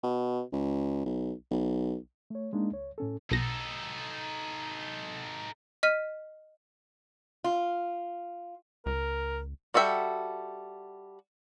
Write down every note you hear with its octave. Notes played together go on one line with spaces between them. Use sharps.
B2
C#2
B1
B1
A3 C#5
G#3 A#3 D4 D#4
C#2 C#5
A2 C#4 A4
B1 D#4 A4 A#6
D#5 F6 B6 D#7
F4
C#2 A#4
G3 F#4 A4 E5 G5